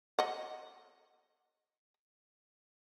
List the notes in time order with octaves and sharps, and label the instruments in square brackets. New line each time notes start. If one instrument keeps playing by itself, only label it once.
[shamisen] D#5 F#5